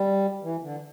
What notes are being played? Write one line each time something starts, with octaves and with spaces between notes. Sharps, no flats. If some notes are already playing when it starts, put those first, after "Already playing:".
Already playing: G3
E3
D3